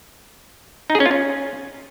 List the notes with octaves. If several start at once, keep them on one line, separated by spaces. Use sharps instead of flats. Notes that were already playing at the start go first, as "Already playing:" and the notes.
D#4
G#4
C#4
F4
C#4